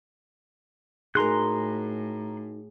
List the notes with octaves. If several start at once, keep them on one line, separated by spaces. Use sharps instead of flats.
A2 D#4 F#4 G#4 A#4 A#5 C6 F#6